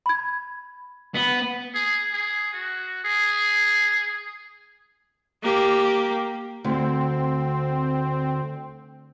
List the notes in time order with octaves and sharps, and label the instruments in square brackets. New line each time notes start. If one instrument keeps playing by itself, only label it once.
[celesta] B5 G#6
[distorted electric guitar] B3
[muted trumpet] G#4
G#4
F#4
G#4
[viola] A#3 G4
[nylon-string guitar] D2 [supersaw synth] C4